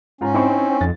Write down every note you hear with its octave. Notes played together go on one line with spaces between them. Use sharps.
G#2 C#4 F4 A#5
C4 D#4 E4 C#6
F2 A6